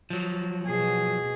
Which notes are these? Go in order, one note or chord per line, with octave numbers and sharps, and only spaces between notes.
F3 F#3
B2 G#4